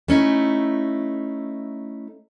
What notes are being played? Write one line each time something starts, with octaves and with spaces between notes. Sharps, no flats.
A3 C#4 D#4 E4